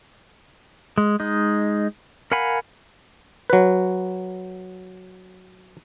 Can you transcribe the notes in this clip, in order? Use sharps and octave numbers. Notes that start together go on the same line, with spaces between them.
G#3
G#3 D#4
A#4 F5 F#5 G#5 B5
F#3 B4